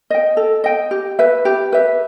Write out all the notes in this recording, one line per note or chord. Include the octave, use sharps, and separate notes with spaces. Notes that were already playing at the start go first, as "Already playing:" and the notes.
D#5 G5
A4
D#5 G5
G4
B4 E5
G4
B4 E5